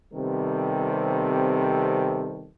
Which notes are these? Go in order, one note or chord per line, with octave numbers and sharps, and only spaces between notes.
C3 D#3 G3 B3 C4 A4